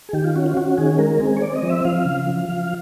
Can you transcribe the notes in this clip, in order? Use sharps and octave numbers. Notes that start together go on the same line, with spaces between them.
G#4
D#3 G4
F4
C#4 F#4
F4
C#4 F#4
D#3 G#4
G#3 A#4
C4 G#4
C#5
C4 D5
D#5
F3
E5
F3 F5
C#3
F3
F3